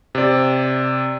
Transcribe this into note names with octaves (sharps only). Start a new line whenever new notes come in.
C3 D5